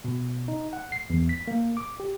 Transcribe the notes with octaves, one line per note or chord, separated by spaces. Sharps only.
B2
D#4
F#5
C7
E2
B6
A#3
D6
G4